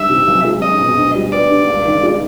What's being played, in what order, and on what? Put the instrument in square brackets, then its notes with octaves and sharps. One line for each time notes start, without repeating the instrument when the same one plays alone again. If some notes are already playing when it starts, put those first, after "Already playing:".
Already playing: [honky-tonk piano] D2 D#3 G3 [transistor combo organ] E5
[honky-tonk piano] C3
B1
G#3
[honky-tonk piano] C#4 [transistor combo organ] D#5
[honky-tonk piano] B2
D2
G3
[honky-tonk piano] B3 [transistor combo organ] D5
[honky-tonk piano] D3
C#2
D#3
G#3